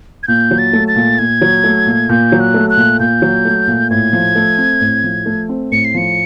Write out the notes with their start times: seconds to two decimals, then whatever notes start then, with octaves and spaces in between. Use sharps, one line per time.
0.23 G#6
0.28 A#2 G6
0.51 F#3
0.58 A6
0.73 A3
0.88 A6
0.96 A#2
1.19 A#2 G#6
1.41 F#3
1.64 A3
1.86 A#2
2.09 A#2 G6
2.32 F#3
2.40 F#6
2.54 A3
2.70 F#6
2.77 A#2
3.00 A#2 G6
3.22 F#3
3.45 A3
3.67 A#2
3.90 A2 G#6
4.13 F3
4.36 A3
4.58 C4
4.81 A2
5.04 F3
5.26 A3
5.49 C4
5.72 A2 C#7
5.85 C7
5.94 F3 C#7